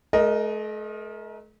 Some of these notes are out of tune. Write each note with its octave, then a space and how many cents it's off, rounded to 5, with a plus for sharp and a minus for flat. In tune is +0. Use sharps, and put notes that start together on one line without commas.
A3 -45 A#4 +15 D#5 -10